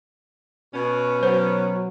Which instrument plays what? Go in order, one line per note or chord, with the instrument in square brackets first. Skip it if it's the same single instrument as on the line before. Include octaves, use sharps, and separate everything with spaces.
[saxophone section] B2 C#4
[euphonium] F#3 [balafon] C5